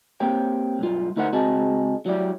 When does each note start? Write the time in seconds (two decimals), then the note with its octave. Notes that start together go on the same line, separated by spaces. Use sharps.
0.20 A#3 C4 G4 C#5 G5
0.79 B1 G2 F4
1.16 D2 D#4 E4 A#4 C5 F#5
1.33 C#2 C4 F#4 G#4 D#5 A5
2.06 F#3 G3 E4 D5